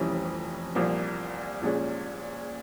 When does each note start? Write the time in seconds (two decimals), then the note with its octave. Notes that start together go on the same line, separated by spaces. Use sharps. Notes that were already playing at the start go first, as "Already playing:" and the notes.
Already playing: F1 F2 E3 G3 C#4
0.75 C2 A#2 F3 A#3
1.61 A#1 A#2 G#3 C#4